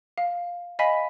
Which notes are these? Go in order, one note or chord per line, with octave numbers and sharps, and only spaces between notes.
F5
D#5 F5 G#5 B5 B6